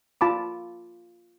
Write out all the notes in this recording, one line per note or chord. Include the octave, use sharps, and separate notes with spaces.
F4 A5 B5 D6